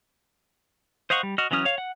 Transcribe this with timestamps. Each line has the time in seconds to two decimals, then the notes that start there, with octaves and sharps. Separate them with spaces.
1.10 C5 D#5 F5 F#5 C#6
1.23 G3
1.38 F#4 D#5 F6
1.51 E3 F#3 C#4 D#6 F6
1.65 C#5 F5
1.78 F#5